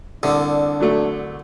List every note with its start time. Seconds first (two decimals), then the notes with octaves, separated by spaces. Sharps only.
0.23 C2 D3 D4
0.80 F#3 A3